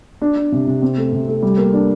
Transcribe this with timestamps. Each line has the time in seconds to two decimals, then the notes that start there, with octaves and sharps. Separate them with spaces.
0.22 D4
0.36 D4
0.52 C3
0.67 C3
0.82 C4
0.97 A3
1.12 C3
1.28 A3
1.43 G3
1.57 A#3
1.73 D4